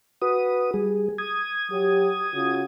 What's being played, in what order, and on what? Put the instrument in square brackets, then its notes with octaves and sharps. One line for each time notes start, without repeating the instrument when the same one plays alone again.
[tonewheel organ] F#4 B4 D#6
G3 G#4
D#6 G#6
[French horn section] F#3 G4
C#3 F4 F#4